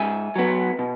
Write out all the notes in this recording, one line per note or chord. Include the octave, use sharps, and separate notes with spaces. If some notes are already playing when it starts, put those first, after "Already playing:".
Already playing: G#2 E5 G#5
F#3 B3
B2